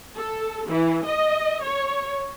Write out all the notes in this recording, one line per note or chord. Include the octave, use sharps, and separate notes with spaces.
A4
E3
D#5
C#5